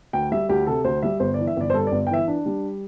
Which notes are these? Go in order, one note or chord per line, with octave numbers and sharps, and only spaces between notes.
D2 G5
G3 E5
D2 G4
C3 A4
D2 C5
G3 E5
G1 C5
E3 D5
E5
G1 D5
C5
G2 A4
D5
G1
G5
E3 E5
D4
G3